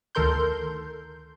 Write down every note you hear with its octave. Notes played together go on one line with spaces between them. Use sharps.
D2 D#3 A4 A#4 C6 G6